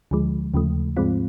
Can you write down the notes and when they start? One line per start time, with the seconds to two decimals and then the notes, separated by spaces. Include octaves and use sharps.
0.11 D2 D3 F3 G#3
0.54 D#2 C#3 F3 A3
0.97 G#2 F3 G#3 C4 F4